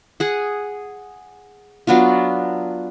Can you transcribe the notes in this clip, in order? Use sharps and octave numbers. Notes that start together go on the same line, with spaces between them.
G#4 F#5
F#3 B3 D4 F4